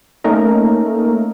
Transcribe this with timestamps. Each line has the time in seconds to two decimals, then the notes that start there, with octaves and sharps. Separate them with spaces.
0.24 A3 A#3 C#4 D#4 A#4